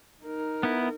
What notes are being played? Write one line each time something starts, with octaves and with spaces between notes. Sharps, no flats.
D#4 A#4
B3 E4